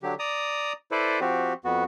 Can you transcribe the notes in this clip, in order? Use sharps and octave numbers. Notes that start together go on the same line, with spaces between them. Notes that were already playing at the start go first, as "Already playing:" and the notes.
D3 F#3 G4
D5 A#5 D#6
E4 A4 B4 C5 D5
F3 C4 F#4 G4
F2 B3 F#4